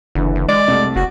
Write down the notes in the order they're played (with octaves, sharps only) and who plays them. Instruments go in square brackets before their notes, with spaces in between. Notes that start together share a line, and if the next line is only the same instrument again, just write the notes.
[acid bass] F#1 [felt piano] D3 E3
[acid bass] F#1
[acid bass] G#3 [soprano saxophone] D5
[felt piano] C2 A3
[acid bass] F#1 [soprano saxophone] F#4